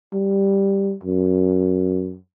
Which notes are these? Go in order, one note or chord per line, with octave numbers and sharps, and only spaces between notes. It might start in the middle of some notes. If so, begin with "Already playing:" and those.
G3
F#2